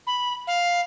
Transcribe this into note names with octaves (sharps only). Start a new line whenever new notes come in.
B5
F5